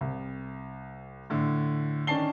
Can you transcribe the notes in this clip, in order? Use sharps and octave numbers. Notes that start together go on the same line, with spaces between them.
C2
A2 D3
D#3 C#4 D4 A5 C7 G7